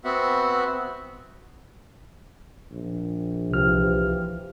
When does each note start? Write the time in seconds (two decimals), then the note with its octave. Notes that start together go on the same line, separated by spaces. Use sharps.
0.04 B3 C4 F#4 E5 F#5
2.71 A#1
3.51 C2 E3 F3 G4 F6